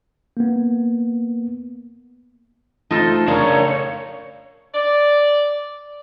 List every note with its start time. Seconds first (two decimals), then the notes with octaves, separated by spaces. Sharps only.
0.37 A#3 B3
2.91 A3 D#4 F4 A4 C5
3.28 C#3 D4 A#4 C#5 F5
4.74 D5